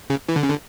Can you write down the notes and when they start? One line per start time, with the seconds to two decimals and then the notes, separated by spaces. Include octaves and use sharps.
0.10 C#3
0.29 E3
0.36 D3
0.43 C#3
0.50 D3